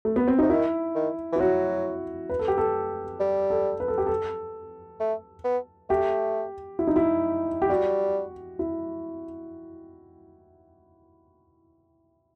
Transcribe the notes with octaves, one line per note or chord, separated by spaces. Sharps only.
A3
B3
C4
C3 D#4
D#3 E4
D#3
E3
E4
F#3 F#4
B4
A4
G4
A4
G3
A4
B4
A4
G4
A4
A3
B3
A3 G4
E4
D#4
E4
G4
G3 F#4
E4